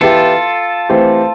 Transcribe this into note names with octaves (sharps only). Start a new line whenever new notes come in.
E3 B3 E4 F4 G4 A4
E3 A3 C4 E4 G4